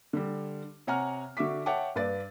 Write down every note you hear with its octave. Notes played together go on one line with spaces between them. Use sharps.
D3 G3
C3 C#5 F#5 G#5 A#5 F6
D3 F#4 E5 D6 B6
C#5 E5 F#5 G5 A5 D6
G2 B4 D5 A6